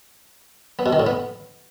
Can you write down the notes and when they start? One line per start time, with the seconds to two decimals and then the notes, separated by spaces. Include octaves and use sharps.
0.79 B3
0.86 B2
0.93 D#3
1.00 A2
1.07 B3